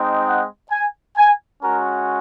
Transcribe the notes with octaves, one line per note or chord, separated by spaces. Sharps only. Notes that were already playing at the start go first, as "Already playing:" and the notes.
Already playing: G#3 C4 D#4
F#5
G#5
G#5
G#3 C#4 F#4 A#4